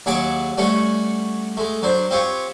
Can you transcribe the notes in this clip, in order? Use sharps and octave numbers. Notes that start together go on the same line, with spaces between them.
D#2 F#3 G#4 F#5 A5 D6
G3 A3 C#4 C#5 F#5
G#3 A3
F#3 D4 C5
C4 F4 G4 C#5